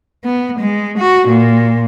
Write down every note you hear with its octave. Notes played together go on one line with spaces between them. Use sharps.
B3
G#3
F#4
A#2